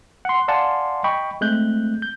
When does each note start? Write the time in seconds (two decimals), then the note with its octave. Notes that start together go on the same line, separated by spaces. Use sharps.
0.25 F#5 C6
0.48 D5 F5 F#5 G#5 A5 C6
1.04 D#5 G5 B5 C#6
1.41 G#3 A3 C4 F#6 G6
2.02 G6